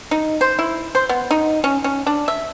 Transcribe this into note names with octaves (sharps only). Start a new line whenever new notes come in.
D#4
C5
E4
C5
B3
D#4
C#4
C#4
D4
E5